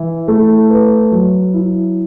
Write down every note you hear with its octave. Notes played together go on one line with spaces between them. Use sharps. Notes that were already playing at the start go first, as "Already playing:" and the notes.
Already playing: E3 E4
A3
B4
F#3
E4